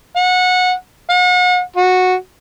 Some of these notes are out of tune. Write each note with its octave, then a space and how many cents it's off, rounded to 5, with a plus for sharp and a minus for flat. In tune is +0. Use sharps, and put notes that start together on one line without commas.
F#5 -20
F#5 -40
F#4 -10